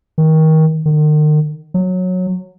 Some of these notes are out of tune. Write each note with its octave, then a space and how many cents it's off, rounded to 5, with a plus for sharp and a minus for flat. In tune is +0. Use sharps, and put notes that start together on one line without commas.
D#3 +25
D#3 -40
F#3 -15